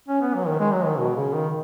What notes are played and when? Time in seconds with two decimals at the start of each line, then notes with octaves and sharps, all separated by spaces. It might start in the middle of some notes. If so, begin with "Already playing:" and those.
0.08 C#4
0.21 B3
0.35 F#3
0.47 D#3
0.59 G#3
0.73 F#3
0.86 D#3
0.99 B2
1.16 C#3
1.33 D#3